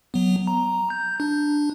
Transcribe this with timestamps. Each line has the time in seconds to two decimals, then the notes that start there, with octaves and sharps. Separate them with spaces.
0.14 F#3 B3
0.47 A#5
0.90 G6
1.20 D4